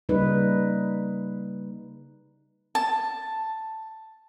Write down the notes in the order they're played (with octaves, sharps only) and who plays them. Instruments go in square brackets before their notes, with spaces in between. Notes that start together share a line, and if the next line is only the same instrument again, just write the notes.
[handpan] C#3 G3 A#3 D#4 B4
[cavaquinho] A5